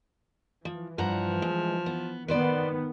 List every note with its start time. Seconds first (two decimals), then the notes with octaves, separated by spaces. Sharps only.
0.65 E3 F3
0.98 G2 F3 F#5 A#5
1.42 G#3
1.86 B3
2.28 D#3 B3 B4 C5 D5